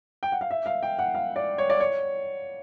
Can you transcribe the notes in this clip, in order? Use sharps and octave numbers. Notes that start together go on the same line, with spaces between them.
G5
F#5
F5
E5
F5
G5
F#5
F5
D5
C#5
D5
C#5